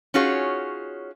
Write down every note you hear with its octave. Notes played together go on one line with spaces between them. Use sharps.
C#4 D#4 F4 F#4 G#4 C#5